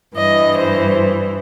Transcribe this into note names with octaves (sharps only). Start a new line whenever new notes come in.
G2 E3 D#5
C5